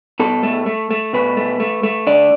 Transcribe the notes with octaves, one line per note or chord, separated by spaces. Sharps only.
B2 A4
A3
A3
A3
B2 B4
A3
A3
A3
D3 D5